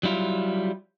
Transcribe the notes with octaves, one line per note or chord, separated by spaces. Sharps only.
F#3 G3 E4 F4